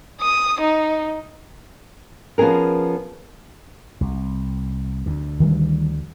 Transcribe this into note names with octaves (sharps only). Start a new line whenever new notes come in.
D#6
D#4
F3 B3 C#4 G#4 A#4
C2
D2 D3
D#3 E3 G3